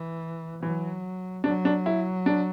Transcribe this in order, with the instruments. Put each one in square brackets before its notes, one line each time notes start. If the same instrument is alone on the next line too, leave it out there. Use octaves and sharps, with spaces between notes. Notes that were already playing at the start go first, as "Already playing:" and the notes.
Already playing: [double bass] E3
[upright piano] E3 [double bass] F#3
[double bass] F#3 [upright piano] D4
[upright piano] D4
E4
D4